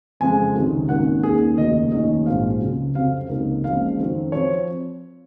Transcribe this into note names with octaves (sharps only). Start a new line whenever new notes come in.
F2 C#3 F3 G#3 C4 G#5
C#2 C3 D#3 F#3
G#1 F#2 D#3 A#3 C#4 F#5
D#2 D#3 A#3 C#4 G#4
F1 D#2 C#3 F#3 A#3 D#5
F1 D#2 D#3 F#3 C#4 D#5
A#1 G#2 F3 G#3 C4 F5
C#2 C#3 F#3
F2 C3 F#3 C4 F5
C#2 C3 F#3 A#3 D#4
F#1 F#2 C#3 F3 G#3 F5
F2 D#3 F#3 C4
F3 C4 C#5